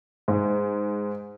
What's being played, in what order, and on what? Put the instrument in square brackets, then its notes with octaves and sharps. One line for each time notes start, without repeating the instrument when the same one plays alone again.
[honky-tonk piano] G#2